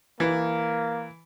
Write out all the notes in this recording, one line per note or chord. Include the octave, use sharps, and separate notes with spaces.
E3 A#3